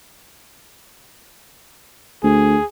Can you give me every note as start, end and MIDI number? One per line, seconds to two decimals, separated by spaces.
2.23 2.56 38
2.23 2.65 68